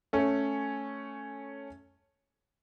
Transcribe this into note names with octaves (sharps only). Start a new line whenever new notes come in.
A3 C#4